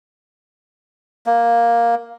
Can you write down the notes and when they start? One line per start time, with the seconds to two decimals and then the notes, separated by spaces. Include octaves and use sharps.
1.26 A#3